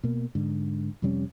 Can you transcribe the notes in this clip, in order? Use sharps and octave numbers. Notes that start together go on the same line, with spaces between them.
B2 A#3
G#2 D3
F2 C3 G3 C#4